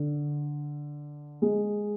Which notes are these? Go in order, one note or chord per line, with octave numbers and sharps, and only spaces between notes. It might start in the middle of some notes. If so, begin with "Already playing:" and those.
Already playing: D3
G#3